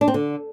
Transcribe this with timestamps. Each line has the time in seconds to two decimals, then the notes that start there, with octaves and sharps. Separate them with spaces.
0.01 D4
0.08 C4
0.14 D3